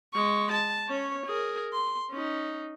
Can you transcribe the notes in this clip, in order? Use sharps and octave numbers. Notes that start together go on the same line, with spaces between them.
G#3 C#6
A5
C#4 C#5
G#4 A#4
C6
C#4 D#4